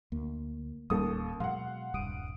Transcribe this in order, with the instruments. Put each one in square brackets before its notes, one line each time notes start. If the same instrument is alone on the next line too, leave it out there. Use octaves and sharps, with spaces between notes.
[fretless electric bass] D2 [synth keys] A#3
[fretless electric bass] D1 A2 C#4 [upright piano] D#2 A4 D#6 [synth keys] G3 A#3
[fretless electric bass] B2 F#3 G#3 [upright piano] F5 F#5 [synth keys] C6
[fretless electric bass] D#1 C2 G2 [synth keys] D#6 D7 D#7